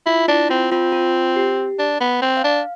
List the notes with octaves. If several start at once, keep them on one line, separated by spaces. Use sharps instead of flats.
E4 F4
D4 E4
C4 F4
C4 F4
F4
G4
D4
B3
C4
F5
D4